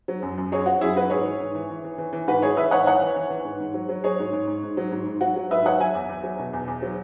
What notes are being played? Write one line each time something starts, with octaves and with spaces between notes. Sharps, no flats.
F#3
F#2
F#2
F#3 G#4 C#5
F#3 F#4
F#2 E4 G#4
F#3 F#4 B4
G#2 G#4 C#5
E3
G#2
E3
E3
E3
E3
E3
G#2 F#4 B4
E3 G#4 C#5
E3 B4 E5
G#2 C#5 F#5
E3 C#5 F#5
E3
E3
E3
G#2
G#2
F#3
F#3
F#3 G#4 C#5
G#2
G#2
G#2
G#2
F#3
G#2
G#2
F#3 F#4
F#3
G#2 B4 E5
F#3 C#5 F#5
F#3 E5 G#5
E2
E2
F#3
B2
E2
E2
F#3